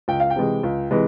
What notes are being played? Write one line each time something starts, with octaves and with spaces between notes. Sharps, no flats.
C#2 G5
F5
G5
C3 E3 G#3
C#2
C3 E3 G#3